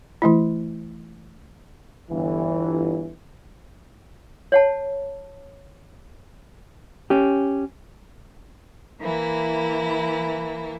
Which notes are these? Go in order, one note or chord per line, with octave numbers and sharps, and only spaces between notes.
E3 A3 E4
G1 E3
C#5 F#5 A5
C#4 G4
E3 A#3 E4